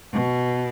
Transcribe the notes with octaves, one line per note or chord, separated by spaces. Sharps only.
B2